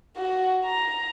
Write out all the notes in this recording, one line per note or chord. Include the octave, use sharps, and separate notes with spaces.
F#4
A#5